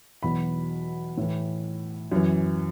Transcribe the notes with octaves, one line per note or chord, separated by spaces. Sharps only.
E2 B2 F#3 B5
A2 E3
F#2 E3